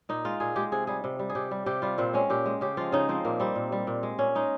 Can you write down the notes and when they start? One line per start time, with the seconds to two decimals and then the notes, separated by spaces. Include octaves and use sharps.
0.09 A#2 D#4
0.25 G#3 F4
0.40 A#2 G#4
0.56 G#3 G4
0.72 C3 G#4
0.87 G3 G#4
1.04 C3
1.19 G3
1.29 G#4
1.35 C3 G4
1.51 G3
1.66 C3 G4
1.82 G3 F4
1.98 A#2 C4
2.13 G#3 C#4
2.30 A#2 G4
2.46 G#3
2.61 C#3 G4
2.77 F3 G#3 F4
2.92 C#3 D#4
3.09 F3 G#3 C4
3.25 A#2 A#3
3.40 G3 C4
3.55 A#2
3.72 G3
3.87 A#2
4.03 G#3
4.19 A#2 C#4
4.35 G#3 D#4